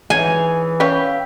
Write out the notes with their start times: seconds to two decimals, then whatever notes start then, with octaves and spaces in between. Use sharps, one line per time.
0.10 E3 D#4 G#4 C#5 E5 G#5
0.80 C#4 G4 B4 E5 F5